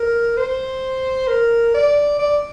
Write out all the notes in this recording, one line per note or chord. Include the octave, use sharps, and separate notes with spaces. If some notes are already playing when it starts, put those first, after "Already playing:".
Already playing: A#4
C5
A#4
D5
D5